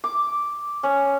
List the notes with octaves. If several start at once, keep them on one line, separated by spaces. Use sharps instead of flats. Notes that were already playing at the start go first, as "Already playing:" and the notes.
D6
C#4